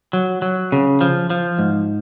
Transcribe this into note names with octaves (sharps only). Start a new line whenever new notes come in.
F#3
F#3
C#3
F3
F3
G#2